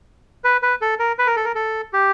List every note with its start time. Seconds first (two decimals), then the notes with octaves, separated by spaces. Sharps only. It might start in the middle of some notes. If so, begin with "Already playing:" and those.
0.44 B4
0.62 B4
0.82 A4
0.99 A#4
1.19 B4
1.27 A#4
1.36 A4
1.45 A#4
1.55 A4
1.93 G4